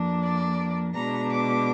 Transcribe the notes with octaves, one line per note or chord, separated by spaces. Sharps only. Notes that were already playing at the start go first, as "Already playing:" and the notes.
Already playing: F2 F3 A#3 D4
D5
B2 G#3 B3 D4 A#5
D6